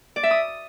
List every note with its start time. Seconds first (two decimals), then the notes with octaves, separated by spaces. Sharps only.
0.16 D5
0.23 E5
0.31 D#6